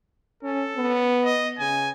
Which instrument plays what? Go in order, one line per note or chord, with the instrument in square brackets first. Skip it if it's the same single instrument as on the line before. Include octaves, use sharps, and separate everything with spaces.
[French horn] C#4 [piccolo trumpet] A4
[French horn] B3
[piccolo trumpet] D#5
[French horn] C#3 [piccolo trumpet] G#5